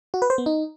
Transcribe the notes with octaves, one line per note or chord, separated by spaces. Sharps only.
F#4
B4
C5
B3
D#4